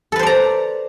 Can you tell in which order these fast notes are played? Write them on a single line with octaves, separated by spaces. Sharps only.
A4 B4 C5 D5 A#5